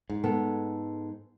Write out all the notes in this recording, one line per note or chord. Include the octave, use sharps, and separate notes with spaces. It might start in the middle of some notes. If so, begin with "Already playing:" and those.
G#2
G#3 B3 A4